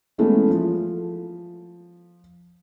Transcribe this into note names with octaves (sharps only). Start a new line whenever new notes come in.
E3 G#3 A3 B3 C#4 E4
F3